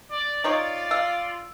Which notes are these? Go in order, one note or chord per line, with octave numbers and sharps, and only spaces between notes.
D5
D#4 F4 C#5 D5
F5 E6